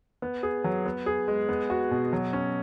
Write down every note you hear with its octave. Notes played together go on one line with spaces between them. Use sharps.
B3
G#4
F#3
B3
G#4
G#3
B3
F#4
B2
F#3
C#4